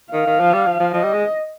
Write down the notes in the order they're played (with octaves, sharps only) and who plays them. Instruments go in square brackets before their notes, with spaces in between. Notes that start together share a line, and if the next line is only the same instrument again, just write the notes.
[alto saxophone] D#3 [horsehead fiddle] F5
[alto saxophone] D#3
F3
G3
F3
F3
[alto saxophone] F3 [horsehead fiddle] D#5
[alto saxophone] G3
G#3